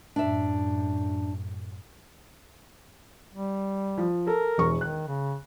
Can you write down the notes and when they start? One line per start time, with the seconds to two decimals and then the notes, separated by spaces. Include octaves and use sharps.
0.16 F#2 A2 D4 E5
3.34 G3
3.98 F3
4.27 A4 A#4
4.58 E1 E2 C#6
4.81 D#3 F#6
5.07 C#3